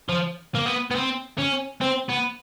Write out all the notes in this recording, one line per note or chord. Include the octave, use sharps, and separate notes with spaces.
F3
A#3
B3
B3
C4
C#4
C4
B3